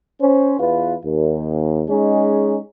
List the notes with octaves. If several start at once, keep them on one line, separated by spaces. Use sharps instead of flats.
C#4 C5
E2 F4 B4
D#2
G#3 C#4 D#4 G#4